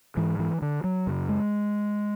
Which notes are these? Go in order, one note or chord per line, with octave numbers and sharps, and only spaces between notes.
G#2 E3
E3
D3
F#3
F#2 C#3
G#3